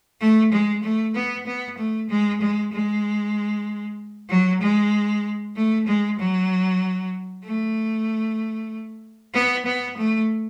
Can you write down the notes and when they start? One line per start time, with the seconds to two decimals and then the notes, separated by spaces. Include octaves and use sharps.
0.20 A3
0.52 G#3
0.83 A3
1.15 B3
1.46 B3
1.78 A3
2.09 G#3
2.41 G#3
2.72 G#3
4.30 F#3
4.61 G#3
5.56 A3
5.88 G#3
6.19 F#3
7.45 A3
9.34 B3
9.65 B3
9.97 A3